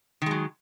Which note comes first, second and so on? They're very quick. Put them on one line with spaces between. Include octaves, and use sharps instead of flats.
D#3 G#3 F#3